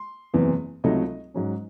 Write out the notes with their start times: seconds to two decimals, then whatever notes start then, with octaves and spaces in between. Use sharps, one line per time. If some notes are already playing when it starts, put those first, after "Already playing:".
Already playing: C6
0.34 F#1 E2 C3 E3 C4
0.84 C#2 C3 F#3 A3 D#4 D#5
1.34 G#2 F#3 C#4